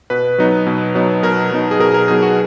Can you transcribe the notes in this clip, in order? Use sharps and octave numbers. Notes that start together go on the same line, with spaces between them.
B2 B4
F#3 B3 D#4
B2
F#3 B3 D#4
B2 A#4
F#3 B3 D#4
G#4
B2 A#4
A#4
F#3 B3 D#4 G#4
F#4